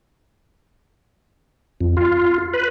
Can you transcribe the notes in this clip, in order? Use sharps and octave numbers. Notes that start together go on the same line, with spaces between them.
F2
F4
B4